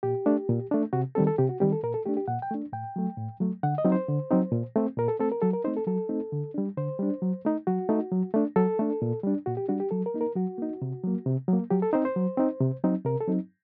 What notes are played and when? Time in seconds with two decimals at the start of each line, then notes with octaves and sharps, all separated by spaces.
0.03 A#2 G4
0.26 A3 D4
0.49 A#2
0.71 A3 D4
0.93 C3 F#4
1.15 D#3 G3 C4 A4
1.27 A4
1.38 C3 G4
1.49 F#4
1.60 D#3 G3 C4 G4
1.72 A4
1.83 A#2 A#4
1.94 A4
2.06 A3 D4 G4
2.17 G4
2.27 A#2 F#5
2.42 G5
2.51 A3 D4
2.73 A2 G5
2.96 F#3 A3
3.17 A2
3.40 F#3 A3
3.63 D3 F#5
3.78 D#5
3.85 F#3 C4 D#4
3.92 C5
4.08 D3
4.31 F#3 C4 D#4
4.52 A#2
4.76 A3 C4
4.97 A#2 A#4
5.08 A4
5.20 A3 C4 A4
5.32 A#4
5.42 F#3 A4
5.53 A#4
5.64 A3 C4 D#4 C5
5.77 A4
5.87 F#3 A4
6.09 A3 C4 D#4
6.32 D3
6.54 G3 D4
6.77 D3 C5
6.99 G3 D4
7.22 F#3
7.45 A3 D#4
7.67 F#3 F#4
7.89 A3 D#4
8.12 F#3
8.34 A3 D4
8.56 F#3 A4
8.79 A3 D4
9.02 A#2
9.23 G3 D4
9.46 A#2 F#4
9.57 G4
9.69 G3 D4 F#4
9.80 G4
9.91 F#3 A4
10.06 A#4
10.14 A#3 D#4
10.21 A#4
10.36 F#3 F#4
10.58 A#3 D#4
10.82 C3
11.04 F#3 A#3
11.26 C3
11.48 F#3 A#3
11.70 F#3 G4
11.82 A4
11.93 C4 D#4 C5
12.05 C5
12.16 F#3
12.38 C4 D#4
12.60 C3
12.84 F#3 C4 D#4
13.05 C3 A#4
13.20 A4
13.28 F#3 C4 D#4